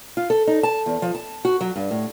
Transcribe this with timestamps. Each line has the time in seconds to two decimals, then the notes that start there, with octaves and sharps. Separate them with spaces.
0.17 F4
0.30 A4
0.47 D#4
0.63 A5
0.86 E2
1.02 F3
1.15 A5
1.45 F#4
1.61 F#3
1.76 G2
1.91 A2